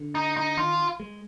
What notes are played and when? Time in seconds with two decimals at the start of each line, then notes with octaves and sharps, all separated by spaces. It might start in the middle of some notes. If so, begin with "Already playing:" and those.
Already playing: D3
0.15 D#4
0.37 D#4
0.58 D#3 F4
1.00 G#3